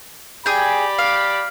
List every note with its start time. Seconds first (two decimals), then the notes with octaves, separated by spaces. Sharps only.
0.46 G4 G#4 D5 G5 B5
0.98 F5